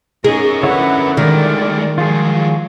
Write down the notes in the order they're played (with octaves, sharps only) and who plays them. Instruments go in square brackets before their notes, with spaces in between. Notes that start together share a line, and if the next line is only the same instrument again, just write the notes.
[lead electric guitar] C#4 A#4 [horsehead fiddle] D#4 D#5 [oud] G#4
[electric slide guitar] D3 E4 C#5 [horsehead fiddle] B4 F#5
[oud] D#3 [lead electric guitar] G3 G#3 [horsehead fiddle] D5
[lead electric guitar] F3 F#3 [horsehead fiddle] G#3 [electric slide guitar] F4 G#4